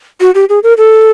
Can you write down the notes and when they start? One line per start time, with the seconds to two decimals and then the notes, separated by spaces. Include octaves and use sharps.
0.21 F#4
0.35 G4
0.49 G#4
0.63 A#4
0.78 A4